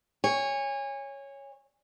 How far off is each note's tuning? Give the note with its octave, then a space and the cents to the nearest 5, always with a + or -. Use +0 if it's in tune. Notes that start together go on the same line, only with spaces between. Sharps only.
C#5 +0 G#5 -25